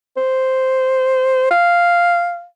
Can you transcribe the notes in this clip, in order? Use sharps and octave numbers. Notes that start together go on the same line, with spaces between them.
C5
F5